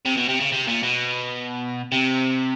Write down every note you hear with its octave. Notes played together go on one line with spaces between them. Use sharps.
C3
B2
C3
C#3
C3
A#2
B2
C3